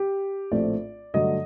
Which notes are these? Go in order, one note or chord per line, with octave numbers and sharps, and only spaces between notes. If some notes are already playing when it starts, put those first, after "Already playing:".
Already playing: G4
A#1 A2 A3 C4 D5
G2 D3 F#3 A3 D#5